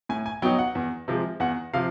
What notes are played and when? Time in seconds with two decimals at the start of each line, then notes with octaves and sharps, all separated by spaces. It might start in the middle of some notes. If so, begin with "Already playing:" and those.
0.09 A2 G#5
0.26 G#5
0.42 F#3 B3 D#4 G5
0.58 F#5
0.75 E2
1.08 C3 F3 G#3
1.40 E2 F#5
1.73 C3 F3 F5